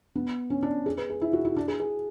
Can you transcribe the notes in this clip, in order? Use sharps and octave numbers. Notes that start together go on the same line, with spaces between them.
B3
C#4
D4
G#4
B4
G#4
E4
F#4
E4
D4
G#4
G#4